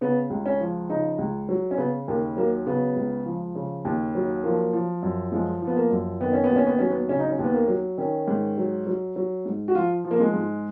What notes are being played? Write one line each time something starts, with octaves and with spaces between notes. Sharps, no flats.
C#3 B3
C#2
C#4
F3
C#3 D#4
C#2
F#3
C#4
C#3 B3
D#2 A#3
F#3 A#3
C#3 B3
C#2
F3
C#3
D#2
F#3
F3 A#3
F3
F#2
F3 G#3
F3
B3
A#3
F#2
D#3 B3
C#4
B3
D#2
C#4
B3
F#3 C#4
B3
C#3 C#4
D#4
C#4
D#2
B3
A#3
F#3
D#3 C#4
G#2
F#3
F#3
F#3
G#2
F#4
F3 F4
F3
A#3
G#3
G#2